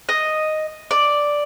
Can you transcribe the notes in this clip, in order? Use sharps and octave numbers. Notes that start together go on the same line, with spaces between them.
D#5
D5